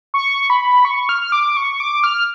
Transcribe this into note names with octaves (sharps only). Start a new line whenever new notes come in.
C#6
B5
C#6
F6
F6
D6
C#6
D6
F6